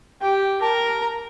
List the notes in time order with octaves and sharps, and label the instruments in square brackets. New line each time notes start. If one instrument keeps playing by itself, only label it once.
[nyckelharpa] G4 [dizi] G5
[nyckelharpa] A#4 [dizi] A5
[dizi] A#5